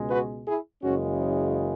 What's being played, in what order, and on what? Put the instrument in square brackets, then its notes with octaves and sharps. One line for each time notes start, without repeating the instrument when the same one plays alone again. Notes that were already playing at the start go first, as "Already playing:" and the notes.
Already playing: [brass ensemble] C#2 B2 G#3
F#4 B4
E4 G#4
F#1 F#2 C#3 E3 G#3 C#4 F#4